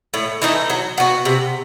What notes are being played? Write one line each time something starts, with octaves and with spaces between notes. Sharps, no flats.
A2
E3 A3 D#4
F#3
B3 F#4
C3